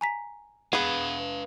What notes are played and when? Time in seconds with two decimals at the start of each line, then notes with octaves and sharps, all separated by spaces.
0.01 G#5 A#5 B6
0.73 B3 G#4 B4 F5